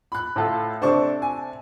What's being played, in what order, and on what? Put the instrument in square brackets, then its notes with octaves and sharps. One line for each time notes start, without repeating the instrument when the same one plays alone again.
[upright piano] B5 F#6
[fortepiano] A2 F4 A4
[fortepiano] C3 D4 A4 [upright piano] C5 D5 C#6
[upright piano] G#5